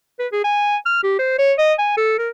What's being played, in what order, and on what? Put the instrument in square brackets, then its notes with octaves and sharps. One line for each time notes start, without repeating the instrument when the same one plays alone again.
[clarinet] B4
G#4
G#5
F6
G4
C5
C#5
D#5
G#5
A4
A#4